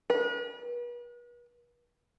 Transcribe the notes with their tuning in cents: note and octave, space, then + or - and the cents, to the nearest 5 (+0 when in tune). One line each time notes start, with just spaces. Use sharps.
B4 -40